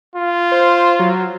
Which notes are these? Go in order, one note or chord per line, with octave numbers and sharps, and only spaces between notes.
F4
C5
F#3